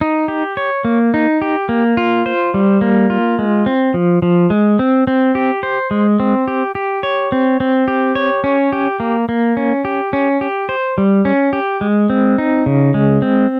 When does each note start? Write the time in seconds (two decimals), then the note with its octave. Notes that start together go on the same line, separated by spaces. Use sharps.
0.01 D#4
0.28 G4
0.57 C#5
0.85 A#3
1.14 D#4
1.42 G4
1.69 A#3
1.97 F4
2.26 C5
2.54 G3
2.81 A#3
3.10 F4
3.39 G#3
3.66 C4
3.94 F3
4.22 F3
4.50 G#3
4.79 C4
5.07 C4
5.35 G4
5.63 C5
5.91 G#3
6.20 C4
6.48 G4
6.75 G4
7.03 C#5
7.32 C4
7.60 C4
7.88 G4
8.15 C#5
8.44 C#4
8.72 G4
9.00 A#3
9.29 A#3
9.57 C#4
9.85 G4
10.13 C#4
10.41 G4
10.69 C5
10.98 G3
11.25 C#4
11.53 G4
11.81 G#3
12.10 C4
12.38 D#4
12.66 C#3
12.94 G#3
13.22 C4